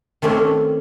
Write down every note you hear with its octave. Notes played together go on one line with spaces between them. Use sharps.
D#3 A3 A#3 C4 C#4